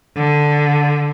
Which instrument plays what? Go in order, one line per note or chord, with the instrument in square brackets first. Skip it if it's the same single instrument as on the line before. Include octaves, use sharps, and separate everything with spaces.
[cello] D3